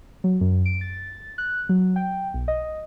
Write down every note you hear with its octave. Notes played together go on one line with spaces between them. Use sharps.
F#3
F#2
D7
A6
F#6
F#3
G5
B1
D#5